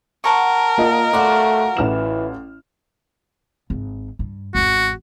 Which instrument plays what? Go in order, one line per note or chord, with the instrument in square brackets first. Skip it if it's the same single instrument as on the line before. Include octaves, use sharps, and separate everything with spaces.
[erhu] A#4 [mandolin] F#5 A5 C#6
[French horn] A#2 [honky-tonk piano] A#3 F4 D#5
[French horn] A3 [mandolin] F4 F#4 D5 [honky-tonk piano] C6 F#6
[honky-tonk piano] A1 F6 E7 [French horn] E3
[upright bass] G#1
G2
[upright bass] G#1 E2 [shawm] F#4